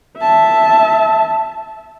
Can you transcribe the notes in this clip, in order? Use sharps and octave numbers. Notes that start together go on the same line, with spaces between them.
E5 A5